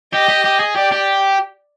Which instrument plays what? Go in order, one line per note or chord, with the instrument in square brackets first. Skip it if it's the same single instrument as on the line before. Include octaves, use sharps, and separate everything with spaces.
[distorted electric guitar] G4 [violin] D#5
[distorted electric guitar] G4
G4
G#4
[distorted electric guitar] G4 [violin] D5
[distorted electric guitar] G4